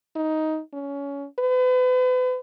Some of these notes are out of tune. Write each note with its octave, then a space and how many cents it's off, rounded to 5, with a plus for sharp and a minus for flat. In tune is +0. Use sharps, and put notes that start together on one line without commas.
D#4 +10
C#4 +20
B4 +40